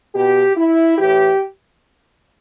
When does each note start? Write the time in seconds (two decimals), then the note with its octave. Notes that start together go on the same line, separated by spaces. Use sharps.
0.14 B2 G4
0.56 E4
0.98 A2 E3 G4